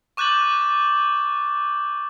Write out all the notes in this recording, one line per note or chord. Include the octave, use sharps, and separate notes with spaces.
C#6 D6 F#6 G6 A6 F#7